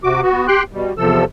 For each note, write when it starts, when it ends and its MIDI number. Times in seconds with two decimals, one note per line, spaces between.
0.04 0.21 48
0.04 0.21 66
0.04 0.21 86
0.22 0.47 59
0.22 0.47 66
0.48 0.63 67
0.48 0.63 79
0.48 0.63 84
0.48 0.63 90
0.73 0.93 47
0.73 0.93 55
0.98 1.25 40
0.98 1.25 48
0.98 1.25 53
0.98 1.25 69
0.98 1.25 88